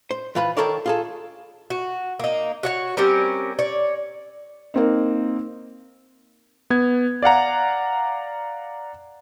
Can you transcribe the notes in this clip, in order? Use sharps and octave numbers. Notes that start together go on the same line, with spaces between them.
C5
E3 F4 B4 B5
D#3 A4 A#4 C#5 D5
F4 G#4 A4
F#4
A#3 D#4
F#4 C#5 F#5
G3 C4 C#4 A#4
C#5 D5
A#3 C4 D#4
B3 G#6
D5 F5 F#5 A#5